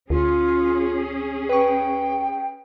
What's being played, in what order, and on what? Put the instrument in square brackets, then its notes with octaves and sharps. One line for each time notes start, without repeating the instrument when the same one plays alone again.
[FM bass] D2 [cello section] C#4 G#4 [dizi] F4
[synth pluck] B4 C#6 [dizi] G5